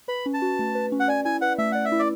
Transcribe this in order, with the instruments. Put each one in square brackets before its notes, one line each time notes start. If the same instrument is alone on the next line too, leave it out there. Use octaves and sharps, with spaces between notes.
[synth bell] B4 [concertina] B5
[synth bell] C#4
[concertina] A5
[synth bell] F#4
A3
B4
C#4
[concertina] F#5
[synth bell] D5 [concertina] G#5
[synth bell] E4 [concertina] G#5
[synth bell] B4 [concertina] F#5
[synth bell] A3 [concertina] E5
[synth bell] D5 [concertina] F#5
[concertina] E5
[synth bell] E4
[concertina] D5